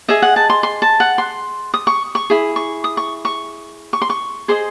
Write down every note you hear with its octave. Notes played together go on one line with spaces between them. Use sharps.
G#4 D#5 E5
F#5
A5
C6
C6
A5
F#5
C6
D#6
C#6
C#6
E4 G#4
C#6
D#6
C#6
C#6
C#6
C6
C#6
G#4 C5 D#5 C6